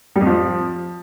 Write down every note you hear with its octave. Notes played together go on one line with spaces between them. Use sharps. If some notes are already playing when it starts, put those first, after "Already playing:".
G3
F2
F3